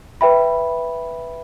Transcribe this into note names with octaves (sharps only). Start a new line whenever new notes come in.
B4 E5 G5 B5